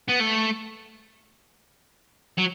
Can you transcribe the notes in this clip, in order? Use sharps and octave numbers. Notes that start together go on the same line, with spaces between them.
B3
A3
F#3